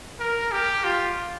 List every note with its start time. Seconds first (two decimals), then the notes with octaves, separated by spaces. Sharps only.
0.20 A#4
0.52 G4
0.84 F4